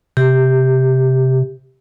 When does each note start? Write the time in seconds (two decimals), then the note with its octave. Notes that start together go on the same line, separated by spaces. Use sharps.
0.17 C3 G4